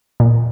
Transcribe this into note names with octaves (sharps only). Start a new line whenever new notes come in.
A#2